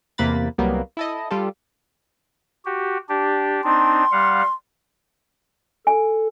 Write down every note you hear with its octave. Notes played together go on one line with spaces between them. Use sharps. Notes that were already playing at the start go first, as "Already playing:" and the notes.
E2 C3 A#3 B4 B5 A6
C2 F#3 G3 A#3 B3
E4 A4 D#5
G3 F4 G4 A4
F#4 G4
D4 G4
C4 D4 D#4 C6
G3 F5 F#5
A4 G#5